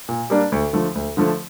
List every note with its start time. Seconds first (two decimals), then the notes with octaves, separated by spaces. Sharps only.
0.09 A#2
0.30 G3 A#3 D4
0.52 D2
0.73 D3 F3 A3
0.95 D2
1.17 D3 F3 A3